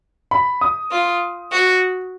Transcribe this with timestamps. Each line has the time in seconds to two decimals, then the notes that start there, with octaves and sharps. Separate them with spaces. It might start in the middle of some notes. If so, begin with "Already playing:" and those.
0.31 B5
0.61 D#6
0.91 F4
1.52 F#4